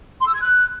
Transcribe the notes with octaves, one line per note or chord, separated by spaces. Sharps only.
C6
E6
G#6
F#6